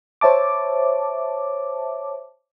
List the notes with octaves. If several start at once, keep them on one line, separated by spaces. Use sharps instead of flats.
C5 C#5 E5 A5 D6